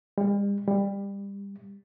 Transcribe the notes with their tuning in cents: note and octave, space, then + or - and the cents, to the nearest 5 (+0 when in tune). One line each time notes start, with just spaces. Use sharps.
G3 +45
G3 +25